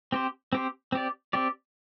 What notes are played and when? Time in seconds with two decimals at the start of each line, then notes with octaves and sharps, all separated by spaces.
0.12 C4 G4 C5
0.53 C4 G4 C5
0.92 C4 G4 D5
1.33 C4 G4 D5